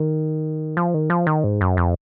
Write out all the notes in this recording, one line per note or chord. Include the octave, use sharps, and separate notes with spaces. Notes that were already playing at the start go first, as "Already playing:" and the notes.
Already playing: D#3
F3
D#3
F3
D#3
G#2
F#2
F2